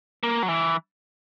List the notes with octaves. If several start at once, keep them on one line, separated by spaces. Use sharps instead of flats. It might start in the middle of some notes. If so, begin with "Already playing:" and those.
A#3
F#3
E3